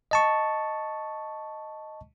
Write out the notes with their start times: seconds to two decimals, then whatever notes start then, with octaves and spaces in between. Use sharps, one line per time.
0.11 D#5 A5 C#6